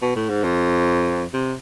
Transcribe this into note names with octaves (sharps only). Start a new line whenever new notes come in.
B2
A2
G#2
F2
C3